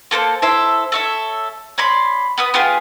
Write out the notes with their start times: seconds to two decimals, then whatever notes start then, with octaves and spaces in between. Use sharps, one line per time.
0.11 A#3 A4 B4 C5
0.42 E4 A4 C5 E5
0.92 A4 C#5 E5
1.78 C#5 D5 B5 C6
2.38 B3 B4 D#6
2.54 B3 F4 G4 G#4